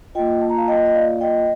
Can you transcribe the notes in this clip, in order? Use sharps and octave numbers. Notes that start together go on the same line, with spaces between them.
A#3 F4 D#5 G5
A5
A#5
F5 A5
D#5 G5
D#5
D5 F5
D#5 G5